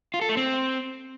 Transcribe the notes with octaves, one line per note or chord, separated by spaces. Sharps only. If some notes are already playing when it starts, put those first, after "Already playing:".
F4
A4
A3
C4